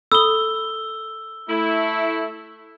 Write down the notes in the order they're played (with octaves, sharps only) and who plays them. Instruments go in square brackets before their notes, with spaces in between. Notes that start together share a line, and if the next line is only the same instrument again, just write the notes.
[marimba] A4 B5 D#6 [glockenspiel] E6 G7
[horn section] A3 E4